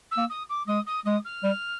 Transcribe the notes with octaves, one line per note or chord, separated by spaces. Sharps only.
E6
A#3
D#6
D6
G#3 D#6
D#6
G#3 D#6
F6
G3